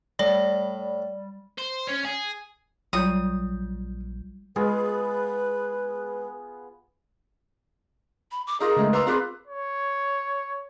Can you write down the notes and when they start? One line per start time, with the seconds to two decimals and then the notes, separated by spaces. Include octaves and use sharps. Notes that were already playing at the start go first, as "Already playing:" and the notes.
0.19 A2 G3 D5
1.58 C5
1.87 C#4
2.05 G#4
2.93 A#1 F#3 G3 F4 C#5 D#6 G6
4.56 G#3 B3 F4 G#4 B4
8.31 B5
8.47 D6
8.60 D#4 F4 G#4 A#4
8.77 C#3 G#3 A3
8.93 B4 A#5 C6 D6 E6
9.07 C4 F4 G#4 B4 D6
9.48 C#5